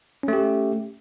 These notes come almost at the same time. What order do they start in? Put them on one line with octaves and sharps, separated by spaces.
C#4 A3 G4